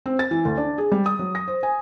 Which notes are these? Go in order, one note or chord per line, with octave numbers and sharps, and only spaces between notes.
C4
A6
E3
D2
D4
G#4
G3
D#6
F#3
A#6
C5
G#5